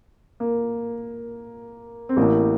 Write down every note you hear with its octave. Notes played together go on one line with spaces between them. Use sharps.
A#3
C4
A1 A2 A#3